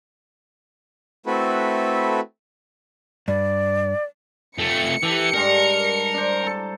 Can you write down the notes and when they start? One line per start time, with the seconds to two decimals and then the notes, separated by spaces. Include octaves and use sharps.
1.26 A3 C4 E4 F#4 A4 B4
3.28 G2 D5
4.59 F2 A3 C#7
5.03 E3 G4 A4
5.34 G2 G#3 D4 A#4
6.14 D4 C5
6.44 A4 A#5